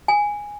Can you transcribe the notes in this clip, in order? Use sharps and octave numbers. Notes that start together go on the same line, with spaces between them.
G#5